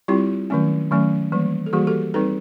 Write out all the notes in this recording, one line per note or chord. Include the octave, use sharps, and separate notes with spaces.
G3 C4 E4 F4 G4
D#3 F#3 A3 C#4
D#3 F#3 A3 C#4
E3 G3 A#3
A4
E3 G3 A#3 F#4 G#4
G4 A4
G3 C4 D#4 A4 B4